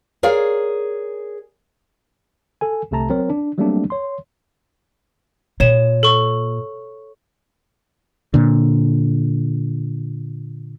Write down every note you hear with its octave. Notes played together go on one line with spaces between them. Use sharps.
G#4 A#4 C#5 D5 F5
A4 G#5
C2 C3 A3 A5 A#5
F#3 C4 A#4 C#5
D4
F#3 G3 A3 A#3 C4 D4
C#5 C6
A#2 C#5 E7
A4 C#6
A#2 D3